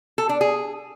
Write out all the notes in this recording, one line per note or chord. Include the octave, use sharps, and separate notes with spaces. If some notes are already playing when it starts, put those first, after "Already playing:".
A4
D4
G#4